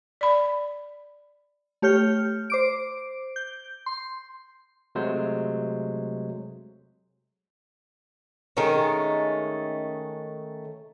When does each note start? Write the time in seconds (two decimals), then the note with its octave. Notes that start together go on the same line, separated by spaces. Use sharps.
0.21 D5 B5
1.82 A3 G4 C#5 F6 G6
2.50 C5 D6 D7
3.36 G6
3.86 C6
4.95 C3 F#3 G#3 A3 C5
8.57 D#3 G#3 A3 C#4